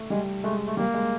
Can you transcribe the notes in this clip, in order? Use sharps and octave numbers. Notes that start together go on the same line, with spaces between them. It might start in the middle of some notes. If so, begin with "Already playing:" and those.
Already playing: A3
G3 G#3
G#3 A3
A3
G3 A#3
G#3